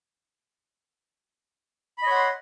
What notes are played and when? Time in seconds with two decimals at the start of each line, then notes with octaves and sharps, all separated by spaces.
1.98 B5
2.02 D#5
2.07 C#5
2.11 F#5
2.16 C6